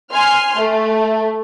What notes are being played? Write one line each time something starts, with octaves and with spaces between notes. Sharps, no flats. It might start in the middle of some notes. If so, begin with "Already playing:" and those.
G#5 C6 F6
A3